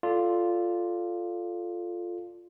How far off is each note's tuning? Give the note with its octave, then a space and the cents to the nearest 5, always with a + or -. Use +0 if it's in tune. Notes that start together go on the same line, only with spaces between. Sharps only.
F4 +0 A4 +0 D5 +0